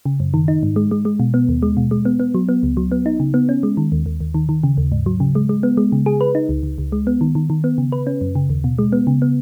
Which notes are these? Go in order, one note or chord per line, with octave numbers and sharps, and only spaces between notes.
C#3
F#2
D#3
D#4
G#2
G#3
G#3
G#3
B2
B3
D#2
G#3
B2
G#3
B3
B3
F#3
B3
C#2
F#3
B3
D#4
C#3
B3
C#4
G#3
D#3
D#2
D#2
D#2
D#3
D#3
C#3
D#2
G#2
F#3
C#3
G#3
G#3
B3
G#3
C#3
G#4
B4
D#4
C#2
C#2
C#2
G#3
B3
D#3
D#3
D#3
B3
C#3
B4
C#4
F#2
C#3
D#2
B2
G#3
B3
C#3
B3